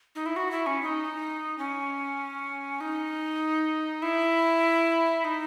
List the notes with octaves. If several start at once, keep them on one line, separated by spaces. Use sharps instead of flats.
D#4
E4
F#4
E4
C#4
D#4
C#4
D#4
E4
D#4